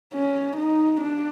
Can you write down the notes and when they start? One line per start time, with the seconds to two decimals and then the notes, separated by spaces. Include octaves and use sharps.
0.14 C#4
0.57 D#4
1.01 D4